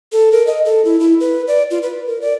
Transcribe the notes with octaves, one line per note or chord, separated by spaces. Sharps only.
A4
A#4
D#5
A4
E4
E4
B4
D5
F4
B4
A#4
D5